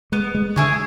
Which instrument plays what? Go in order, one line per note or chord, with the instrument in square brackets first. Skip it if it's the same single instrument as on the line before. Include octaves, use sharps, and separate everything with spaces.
[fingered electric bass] G#3 [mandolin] B3
[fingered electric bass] G#3
[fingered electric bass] D3 [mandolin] E4 G#4 C#5